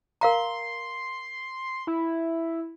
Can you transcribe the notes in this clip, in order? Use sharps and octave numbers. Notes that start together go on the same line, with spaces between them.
A#4 F5 A#5 C6
E4